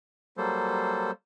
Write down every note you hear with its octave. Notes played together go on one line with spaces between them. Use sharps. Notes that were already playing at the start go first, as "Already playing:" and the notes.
F#3 G3 A#3 A4 C5